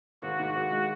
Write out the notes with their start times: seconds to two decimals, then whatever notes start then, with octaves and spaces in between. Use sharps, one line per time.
0.22 G#1 F#4
0.39 G#2
0.55 G#1 F#4
0.71 G#3